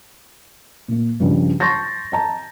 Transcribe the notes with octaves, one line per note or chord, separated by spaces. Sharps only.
A#2 A#3
G2 C#3 F3 G3
A5 C6 C#6 G6 A6 A#6
D#5 A5 A#5